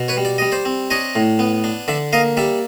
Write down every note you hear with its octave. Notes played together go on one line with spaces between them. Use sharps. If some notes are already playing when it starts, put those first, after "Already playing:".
Already playing: B2
B4 C#5
G3
D5
G3 D#5
C5 D5
C4
D4 C#5 D#5
A2
B3
D4
D3 D5 E5
A#3 D#5 F5
G3 D5 E5